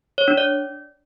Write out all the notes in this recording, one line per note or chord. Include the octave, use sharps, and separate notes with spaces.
C#5
D4
D5